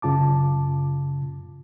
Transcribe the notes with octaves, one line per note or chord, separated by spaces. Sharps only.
F#2 C#3 F4 A5 D6